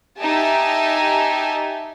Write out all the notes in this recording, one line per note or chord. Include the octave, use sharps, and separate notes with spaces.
D#4 G4 E5 G#5 A5